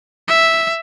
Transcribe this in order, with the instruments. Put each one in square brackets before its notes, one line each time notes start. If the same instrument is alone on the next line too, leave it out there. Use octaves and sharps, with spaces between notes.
[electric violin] E5